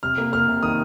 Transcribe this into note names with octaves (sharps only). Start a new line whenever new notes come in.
C3 F6
A#3
A#3 F6
C3
D#3 D#6